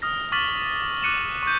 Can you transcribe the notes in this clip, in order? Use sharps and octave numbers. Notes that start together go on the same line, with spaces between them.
D#6 F6 A#6
C#6 D6 F6 A6 B6 F#7
D6 F#6 C#7 D#7 E7
C#6 G6